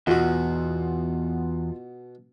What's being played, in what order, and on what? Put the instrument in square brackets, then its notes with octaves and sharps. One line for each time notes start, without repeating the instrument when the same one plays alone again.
[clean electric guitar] E2 [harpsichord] B2 F#4 [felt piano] B3 F4